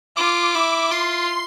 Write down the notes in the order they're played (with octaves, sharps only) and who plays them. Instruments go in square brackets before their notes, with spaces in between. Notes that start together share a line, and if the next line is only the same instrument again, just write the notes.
[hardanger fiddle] F4 [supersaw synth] D6
[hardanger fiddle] E4 [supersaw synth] D6
[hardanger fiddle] F4 [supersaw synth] C6